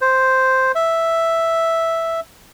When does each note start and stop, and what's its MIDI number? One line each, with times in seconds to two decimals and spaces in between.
0.01 0.72 72
0.75 2.20 76